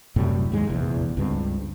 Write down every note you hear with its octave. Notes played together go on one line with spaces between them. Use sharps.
F#2 A2 C3 G3
D#2 G#2 G#3
F1 A#1 E2
C#2 G2 C4